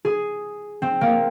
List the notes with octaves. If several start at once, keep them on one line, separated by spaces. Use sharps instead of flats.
G#4
C4
A#3